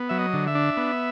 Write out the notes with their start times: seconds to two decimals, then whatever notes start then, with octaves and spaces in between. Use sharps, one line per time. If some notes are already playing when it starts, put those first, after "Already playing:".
Already playing: B3
0.09 F#3 E5
0.19 D#5
0.33 D3
0.47 E5
0.55 D4
0.77 B3